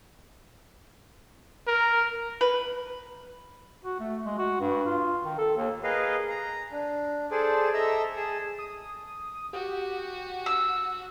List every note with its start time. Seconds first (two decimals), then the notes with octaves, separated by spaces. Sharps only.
1.68 A#4
2.41 B4
3.85 F#4
4.00 A3
4.25 G#3
4.39 F#4
4.60 G2
4.86 F4
5.25 D#3
5.38 A4
5.57 D#2
5.84 G#4 A#4 B4 D#5 F5
6.29 A#5
6.72 D4
7.31 G#4 A4 C5 D5
7.74 A4 D#5 E5 A#5 E6
8.16 G#4 A5
8.59 D#6
9.53 F#4 G4
10.46 E6